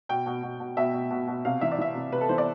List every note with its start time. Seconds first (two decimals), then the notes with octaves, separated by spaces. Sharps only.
0.09 B2 G5
0.26 B2
0.43 B2
0.60 B2
0.77 B2 E5
0.94 B2
1.11 B2
1.28 B2
1.45 C3 F5
1.61 E3 E5
1.72 D5
1.78 E3 E5
1.95 C3
2.12 C3 B4
2.21 A4
2.29 E3 C5
2.38 D5